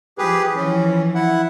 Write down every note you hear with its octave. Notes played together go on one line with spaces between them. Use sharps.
F3 G4 G#4 B4
E3 F3 C#4
E4 F#5